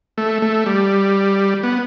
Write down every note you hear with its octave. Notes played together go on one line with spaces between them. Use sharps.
A3
A3
G3
B3